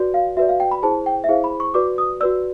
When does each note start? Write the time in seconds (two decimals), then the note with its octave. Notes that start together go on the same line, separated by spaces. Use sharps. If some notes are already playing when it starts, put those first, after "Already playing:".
Already playing: F#4 B4 D5
0.14 F5
0.37 F#4 B4 D5 E5
0.49 F5
0.60 G5
0.71 B5
0.83 E4 G#4 C5 A5
1.06 G5
1.24 E5
1.29 E4 G#4 C5 F5
1.44 B5
1.60 C#6
1.74 F#4 B4 D5 D6
1.98 D#6
2.21 F#4 B4 D5 E6